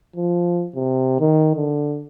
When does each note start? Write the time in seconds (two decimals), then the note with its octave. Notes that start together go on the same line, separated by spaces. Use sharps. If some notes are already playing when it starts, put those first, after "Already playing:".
0.16 F3
0.76 C3
1.20 D#3
1.56 D3